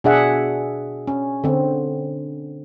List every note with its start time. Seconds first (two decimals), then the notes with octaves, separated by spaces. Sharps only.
0.04 B2 D4 G#4 E5 F#5
1.07 C#4
1.44 D3 C4